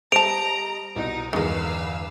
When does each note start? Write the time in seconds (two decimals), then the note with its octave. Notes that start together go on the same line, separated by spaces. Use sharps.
0.12 G3 C5 D#5 A5 A#5 D7 F7
0.96 C2 B2 D#4
1.33 E2 G2 D3 D#3 G#3 B4 F5 E6